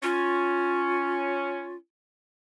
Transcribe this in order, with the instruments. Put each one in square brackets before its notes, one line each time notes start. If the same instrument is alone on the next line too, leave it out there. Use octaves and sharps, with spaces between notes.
[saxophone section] C#4 [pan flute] F4